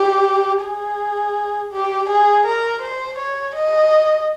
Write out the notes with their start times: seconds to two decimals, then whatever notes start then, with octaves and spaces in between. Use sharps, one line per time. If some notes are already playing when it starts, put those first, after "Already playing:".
Already playing: G4
0.63 G#4
1.72 G4
2.09 G#4
2.46 A#4
2.82 C5
3.18 C#5
3.55 D#5